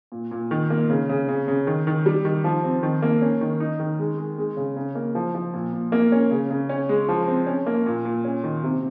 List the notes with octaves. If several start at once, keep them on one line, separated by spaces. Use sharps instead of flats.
A#2
A#2
D#3
A#3
C#3
C#3
C#3
C#3
D#3
D#3
G3
D#3
F3
C4
D#3
A#3
C#4
D#3
D#4
D#3
G#3
G#3
G#3
C#3
C#3
A#3
F3
F3
A#2
A#2
A#3
C#4
C#3
C#3
C#4
G#3
F3
C4
C#4
A#3
A#2
A#2
C#4
D#3
C3